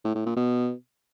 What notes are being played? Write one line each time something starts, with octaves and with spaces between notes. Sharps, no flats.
A2
A2
A#2
B2